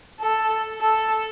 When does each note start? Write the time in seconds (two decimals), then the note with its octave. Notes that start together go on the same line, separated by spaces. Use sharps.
0.20 A4
0.80 A4